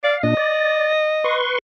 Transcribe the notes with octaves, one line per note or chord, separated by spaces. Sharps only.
D5 F5
A#2 D4 D#5
D5
B4 C6 C#6